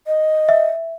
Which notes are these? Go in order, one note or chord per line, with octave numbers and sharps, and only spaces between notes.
D#5
E5